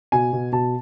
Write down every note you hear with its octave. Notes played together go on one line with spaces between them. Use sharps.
B2 G#5
B2
B2 A5